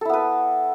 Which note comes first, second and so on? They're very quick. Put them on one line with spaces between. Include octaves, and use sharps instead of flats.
A4 E4 B3 B4